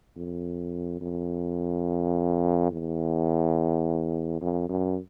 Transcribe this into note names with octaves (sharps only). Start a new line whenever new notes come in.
F2
F2
E2
F2
F#2